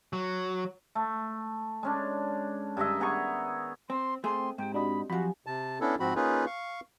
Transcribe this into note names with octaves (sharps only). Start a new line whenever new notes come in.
F#3
A3
G#3 C#4 D4
G2 D#3 D#5 E5
B3 G#4 A#5 C#6
C4 C6
A3 C4 G#4 C5 G5 C6
G#2 C4 G4 G5
D4 F#4 D#5 B5
F2 F3 F#3 F#4 G4 G#5 B5
C3 A5
B3 C#4 D4 E4 A4
G#2 F3 C4 F#4 B5
A#3 C#4 D#4 F4 G#4 B4
F5 C#6